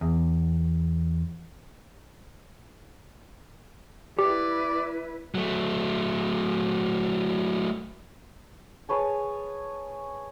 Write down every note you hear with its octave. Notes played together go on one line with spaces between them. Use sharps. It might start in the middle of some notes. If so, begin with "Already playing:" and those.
E2
E4 G4 B4 D5
F#3 A3
G#4 B4 C#5 A5